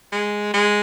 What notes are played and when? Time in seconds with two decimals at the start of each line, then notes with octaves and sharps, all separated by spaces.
0.12 G#3
0.53 G#3